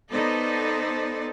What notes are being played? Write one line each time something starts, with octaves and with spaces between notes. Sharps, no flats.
B3 D#4 A4 C5 D5